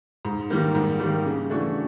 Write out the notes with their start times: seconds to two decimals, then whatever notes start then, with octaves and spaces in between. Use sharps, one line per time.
0.25 G#2
0.50 D#3 G3 A#3
0.75 G#2
1.00 D#3 G3 A#3
1.25 C#3
1.50 E3 A3 D4 F#4